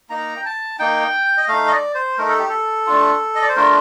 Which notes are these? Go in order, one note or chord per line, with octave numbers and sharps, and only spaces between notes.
A#3 D#4 A#5
G5
A5
A#3 D#4 G5
D#5
A3 D#4 F5
D#5
D5
C5
A3 D#4 A#4
A4
G4
A4
A3 D4 F4
D#5
D5
C5
A3 D4 F4 A#4